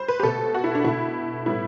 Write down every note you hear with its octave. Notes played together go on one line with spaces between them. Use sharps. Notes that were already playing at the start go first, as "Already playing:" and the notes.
Already playing: G3 C5
B4
G4
B2 A3 A4
F#4
E4
D4
B2 A3 E4
A2 G3 B3 E4